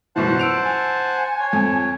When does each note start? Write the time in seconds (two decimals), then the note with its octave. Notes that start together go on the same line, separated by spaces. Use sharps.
0.16 F#1 B2 E3 C5 F#5 A5
0.39 E6 D7 F7
0.65 G#5
1.40 C#5
1.53 F2